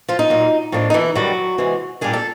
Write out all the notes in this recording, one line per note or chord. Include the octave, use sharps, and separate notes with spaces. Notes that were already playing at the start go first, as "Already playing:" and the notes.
F3 F4
D#4
A#2 F#3 A#3
A2 F3 A#3 D4 D#4
D#4
E3 E4
G2 D#3 F#3 G3 F#4
C3 E3 G#3
A#2 G3 A#3 D4 G#4
A4